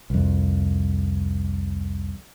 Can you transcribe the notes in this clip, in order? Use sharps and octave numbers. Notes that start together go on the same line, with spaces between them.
C2 F2